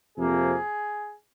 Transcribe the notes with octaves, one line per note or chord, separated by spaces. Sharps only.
F2 C3 F3 A#3 G#4